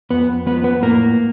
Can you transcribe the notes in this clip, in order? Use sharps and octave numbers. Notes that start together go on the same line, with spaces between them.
F2 B3 B4
F3 B3 B4
B3 B4
A2 A#3 A#4